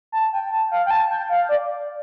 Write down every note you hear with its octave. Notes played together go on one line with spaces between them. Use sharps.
A5
G5
A5
F5
G5
A5
G5
F5
D5